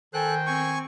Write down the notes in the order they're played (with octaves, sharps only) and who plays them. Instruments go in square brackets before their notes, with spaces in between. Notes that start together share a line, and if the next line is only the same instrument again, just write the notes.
[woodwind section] D#3 C5 G5 [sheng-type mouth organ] A4 F#6 [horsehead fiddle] G#5
[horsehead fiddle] C4 [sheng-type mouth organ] G#5 C#6